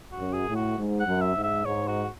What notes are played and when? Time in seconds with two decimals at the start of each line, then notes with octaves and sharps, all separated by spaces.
0.12 F#4
0.19 F#2
0.33 G#4
0.48 A2
0.56 F#4
0.78 G#2
1.00 F#5
1.06 F#2
1.21 E5
1.36 G#2
1.44 E5
1.65 G#2 C#5
1.87 F#4